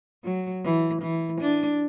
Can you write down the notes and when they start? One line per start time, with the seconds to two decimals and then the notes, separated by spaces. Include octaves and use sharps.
0.24 F#3
0.64 E3
1.02 E3
1.41 D4